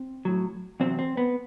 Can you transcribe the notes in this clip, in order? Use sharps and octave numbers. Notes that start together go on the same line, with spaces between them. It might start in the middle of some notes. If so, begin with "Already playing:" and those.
Already playing: C4
A2 F#3
E2 C3 F#3 C4
C4
B3